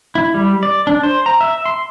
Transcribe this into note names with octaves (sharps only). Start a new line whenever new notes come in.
E4
G3
D5
D4
C5
A#5
E5
C6